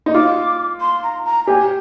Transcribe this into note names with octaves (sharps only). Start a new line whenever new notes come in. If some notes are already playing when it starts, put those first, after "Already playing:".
D#4
F4 D6
C6
A#5
A#5
G4 G#5